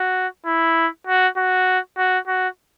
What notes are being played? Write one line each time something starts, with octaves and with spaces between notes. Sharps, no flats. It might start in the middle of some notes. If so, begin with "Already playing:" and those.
Already playing: F#4
E4
F#4
F#4
F#4
F#4